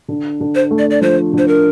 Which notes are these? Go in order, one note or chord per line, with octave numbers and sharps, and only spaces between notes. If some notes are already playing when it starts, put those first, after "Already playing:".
D3
D3
C5
A3
D5
D5
F3 C5
D3 C5
A#4